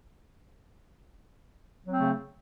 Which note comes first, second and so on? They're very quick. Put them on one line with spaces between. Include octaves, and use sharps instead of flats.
F#3 C4 A3 C#3